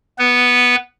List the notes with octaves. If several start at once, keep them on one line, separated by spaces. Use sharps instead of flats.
B3 B4